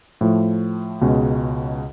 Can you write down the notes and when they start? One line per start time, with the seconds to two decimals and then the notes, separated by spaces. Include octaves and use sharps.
0.21 A2 F3 A3
1.01 C#2 B2 G#3 C#4